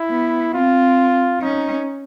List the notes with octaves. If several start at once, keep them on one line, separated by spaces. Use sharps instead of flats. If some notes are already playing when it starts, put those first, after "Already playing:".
Already playing: E4
B3
C4 F4
C#4 D#4